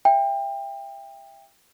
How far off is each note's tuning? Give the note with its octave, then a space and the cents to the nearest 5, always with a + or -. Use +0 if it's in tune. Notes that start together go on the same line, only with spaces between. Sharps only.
E5 +10 G5 +25